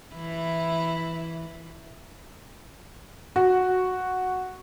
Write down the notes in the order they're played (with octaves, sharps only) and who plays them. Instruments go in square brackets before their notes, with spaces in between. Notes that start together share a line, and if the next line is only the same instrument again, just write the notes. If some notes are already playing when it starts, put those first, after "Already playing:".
[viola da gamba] E3 E4
[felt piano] F#4